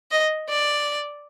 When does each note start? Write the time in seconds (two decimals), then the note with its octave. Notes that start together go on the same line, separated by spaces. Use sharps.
0.11 D#5
0.50 D5